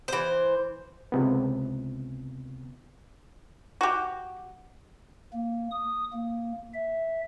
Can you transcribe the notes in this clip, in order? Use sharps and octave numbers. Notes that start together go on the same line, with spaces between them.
E3 C5
C#2 C3 B3
F#4 G4
A#3
D#6
A#3
E5